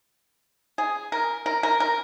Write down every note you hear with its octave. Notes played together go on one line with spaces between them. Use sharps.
G#4
A#4
A#4
A#4
A#4